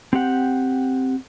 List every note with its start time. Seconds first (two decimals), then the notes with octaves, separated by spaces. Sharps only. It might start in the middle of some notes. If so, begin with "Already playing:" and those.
0.13 C4 G4 F#5